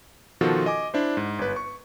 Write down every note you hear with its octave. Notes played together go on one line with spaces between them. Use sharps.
B2 D#3 F3 F4 F#4 A4
D#5 G#5 D6
D4 E4 C5
G#2
G1 B4
C#6